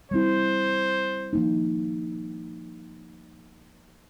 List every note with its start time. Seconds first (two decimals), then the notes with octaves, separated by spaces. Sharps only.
0.11 G3 C4 E4 C5
1.33 F3 A#3 D#4